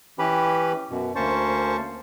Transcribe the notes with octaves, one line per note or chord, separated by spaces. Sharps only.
E3 C#4 G4 B4 B5
F#2 B2
D2 A#3 C#4 C5 A5 C#6